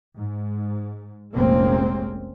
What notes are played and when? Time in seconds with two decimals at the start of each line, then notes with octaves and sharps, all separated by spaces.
0.16 G#2
1.33 F1 A#1 G#3 A#3 C4 C#4